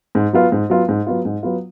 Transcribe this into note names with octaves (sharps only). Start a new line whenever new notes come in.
G#2
F#3 B3 F4
G#2
F#3 B3 F4
G#2
F#3 B3 F4
G#2
F#3 B3 F4